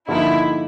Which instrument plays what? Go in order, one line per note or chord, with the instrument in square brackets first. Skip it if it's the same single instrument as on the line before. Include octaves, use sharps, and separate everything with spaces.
[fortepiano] D3 F3 A#3 D#4 [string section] E4